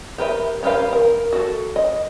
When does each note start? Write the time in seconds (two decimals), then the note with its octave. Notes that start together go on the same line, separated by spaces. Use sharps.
0.18 G4 A#4 B4 E5
0.63 C#4 G4 A#4 B4 F5
0.93 A#4
1.33 F#4 A4
1.76 D#5